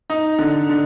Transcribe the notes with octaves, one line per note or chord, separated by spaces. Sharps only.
D#4
D3
D3